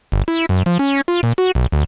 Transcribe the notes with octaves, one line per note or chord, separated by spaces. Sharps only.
G1
E4
F#2
F3
C#4
F4
A#2
F#4
B1
D2